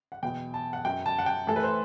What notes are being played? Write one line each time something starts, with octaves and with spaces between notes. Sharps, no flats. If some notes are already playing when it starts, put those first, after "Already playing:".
F#5
E2 B2 F#3 G5
A5
F#5
F#2 F#3 G5
A5
F#5
G5
A2 E3 A4
B4
C5